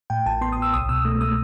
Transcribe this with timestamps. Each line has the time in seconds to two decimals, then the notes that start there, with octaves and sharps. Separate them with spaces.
0.10 A2 G5
0.26 A1 A5
0.41 B3 C6
0.52 D#6
0.57 A1 E6
0.73 C2 D#6
0.89 B2 E6
1.05 A3
1.21 A3 D#6